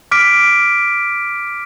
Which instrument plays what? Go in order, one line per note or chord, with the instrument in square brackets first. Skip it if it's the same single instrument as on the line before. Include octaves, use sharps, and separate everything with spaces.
[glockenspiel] D6 F6 B6 D7